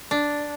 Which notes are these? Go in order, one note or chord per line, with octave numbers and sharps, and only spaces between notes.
D4